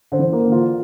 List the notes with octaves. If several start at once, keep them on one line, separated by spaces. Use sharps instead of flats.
D3 C5
E3
A#3
D3
F4